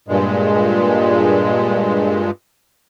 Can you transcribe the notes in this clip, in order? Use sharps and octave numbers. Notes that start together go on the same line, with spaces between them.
G2 A#2 G#3